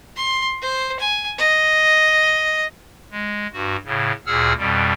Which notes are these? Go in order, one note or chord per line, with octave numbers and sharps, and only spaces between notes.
C6
C5
G#5
D#5
G#3
G2 F#4
A2 C#3
D2 A#2 G#4 F#5 E6 F6
F2 B2 G3